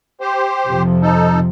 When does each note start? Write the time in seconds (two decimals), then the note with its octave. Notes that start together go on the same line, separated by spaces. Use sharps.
0.21 G4 C5
0.66 F2 C3 F3
1.02 D#4 A4